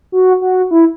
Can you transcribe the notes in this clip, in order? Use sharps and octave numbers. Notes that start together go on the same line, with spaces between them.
F#4
F#4
E4